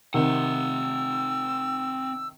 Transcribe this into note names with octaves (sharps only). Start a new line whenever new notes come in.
C3 D#3 C4 F#5 E6